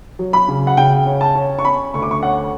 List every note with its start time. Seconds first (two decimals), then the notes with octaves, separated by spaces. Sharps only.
0.19 F#3
0.33 B5
0.48 C#3
0.67 F#5
0.77 C#3 G5
1.06 C#4
1.21 A5
1.35 C#4
1.59 C#6
1.65 C#4 B5
1.94 D2 C#6
2.02 D6
2.11 C#6
2.23 C#4 F#5